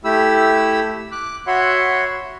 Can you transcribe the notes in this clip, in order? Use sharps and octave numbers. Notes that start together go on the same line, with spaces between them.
A3 E4 G4 B5 E6
D6 F#6
F#4 C#5 E5 F#5 B5 C6